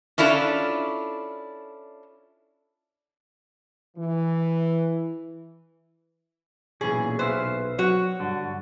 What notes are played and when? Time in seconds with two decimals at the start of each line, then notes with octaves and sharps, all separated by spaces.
0.18 C#4 D4 E4 F4 A4
3.97 E3
6.81 B1 A#2 E3 C#4 G#4
7.19 B4 C5 E5 F5
7.78 F#3 F#4 C#5
8.20 G2 D3